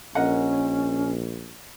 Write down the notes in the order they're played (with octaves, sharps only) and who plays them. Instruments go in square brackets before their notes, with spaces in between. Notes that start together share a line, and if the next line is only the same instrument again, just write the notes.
[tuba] A#1 [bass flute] C#4 [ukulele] A#4 D#5 F#5